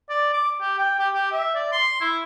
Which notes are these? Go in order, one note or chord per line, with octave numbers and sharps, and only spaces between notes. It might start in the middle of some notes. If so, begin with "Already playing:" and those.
D5
D6
G4
G5
G4
G4
E5
D5
C6
E4